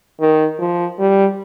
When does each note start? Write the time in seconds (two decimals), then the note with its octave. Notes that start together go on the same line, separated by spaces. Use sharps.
0.20 D#3
0.60 F3
0.99 G3